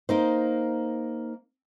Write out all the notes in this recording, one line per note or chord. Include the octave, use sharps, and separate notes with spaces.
A#3 D#4 C5